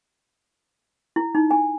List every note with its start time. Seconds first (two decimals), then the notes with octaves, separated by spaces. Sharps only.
1.16 E4
1.35 D#4
1.51 G#5